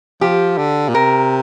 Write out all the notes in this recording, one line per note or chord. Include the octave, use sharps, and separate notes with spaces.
F3 G4
D3
A#2
C3 A#4